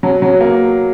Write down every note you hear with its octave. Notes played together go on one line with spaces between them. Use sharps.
F#3
F#3
A#3